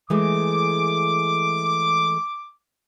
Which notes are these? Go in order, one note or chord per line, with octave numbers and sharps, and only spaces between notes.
E3 G#3 A3 D6